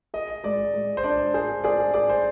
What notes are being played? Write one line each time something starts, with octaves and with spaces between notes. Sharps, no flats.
G#4 D#5
G#3 D5
G#3
C5
D4 D5
G#4 C5
G#4 D5
G#4 D5
C5